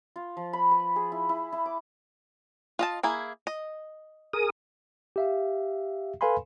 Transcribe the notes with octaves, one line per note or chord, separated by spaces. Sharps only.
F4
F3
B5
B4
G#4
E4
E4
E4
D6
F4 D#5 A5
A#3 E4 G#4
D#5
G#4 A#4 D#6
G4 E5 F5
A4 B4 F5 G#5 B5 C6